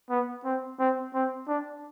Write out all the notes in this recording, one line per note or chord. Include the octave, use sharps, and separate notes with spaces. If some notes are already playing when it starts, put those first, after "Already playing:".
B3
C4
C4
C4
D4